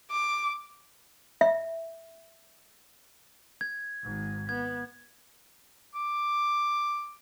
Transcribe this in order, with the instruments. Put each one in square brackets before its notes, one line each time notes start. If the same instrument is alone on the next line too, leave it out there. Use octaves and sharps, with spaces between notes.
[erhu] D6
[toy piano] E5
[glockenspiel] G#6
[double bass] G#1 G#2
[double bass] B3 [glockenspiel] G#6
[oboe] D6